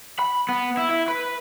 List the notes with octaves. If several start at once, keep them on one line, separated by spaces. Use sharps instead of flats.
B5
B3
E4
E4
B4